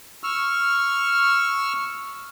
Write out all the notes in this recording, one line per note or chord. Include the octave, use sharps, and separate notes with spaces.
C#6 E6 F6